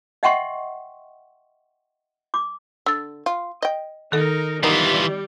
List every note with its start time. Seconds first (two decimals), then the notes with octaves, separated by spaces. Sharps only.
0.23 D#5 E5 F#5 G5 C6 C#6
2.34 D6
2.86 D3 E6 A6
3.26 F4
3.62 D#5 G5
4.12 D#3 D#4 A4 A#4
4.63 E3 G3 B3 D#4 F4 G4 A#4